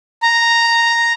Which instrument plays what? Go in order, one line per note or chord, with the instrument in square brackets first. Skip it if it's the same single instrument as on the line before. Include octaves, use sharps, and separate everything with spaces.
[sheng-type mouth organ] A#5